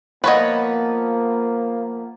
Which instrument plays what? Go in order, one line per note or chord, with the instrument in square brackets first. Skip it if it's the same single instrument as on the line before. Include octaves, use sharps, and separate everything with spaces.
[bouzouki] F3 B3 [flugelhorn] A#3 [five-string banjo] B4 C#5 D#5